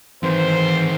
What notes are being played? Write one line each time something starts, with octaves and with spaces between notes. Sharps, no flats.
D#3 E3 C4 C5